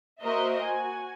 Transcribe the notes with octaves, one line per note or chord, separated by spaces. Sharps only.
A#3 F#4 A#4 C5 D#5 E5
F#4 G#5